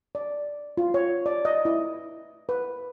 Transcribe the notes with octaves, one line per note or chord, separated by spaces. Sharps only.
D5
F4
C#5
D5
D#5
E4
B4